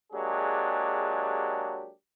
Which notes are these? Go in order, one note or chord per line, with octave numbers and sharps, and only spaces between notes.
F#3 G#3 A#3 D4 G4 G#4